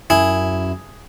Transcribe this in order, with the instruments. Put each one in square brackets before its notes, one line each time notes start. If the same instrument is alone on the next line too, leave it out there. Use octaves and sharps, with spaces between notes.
[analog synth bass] F#2 [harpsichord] E4 [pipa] G#4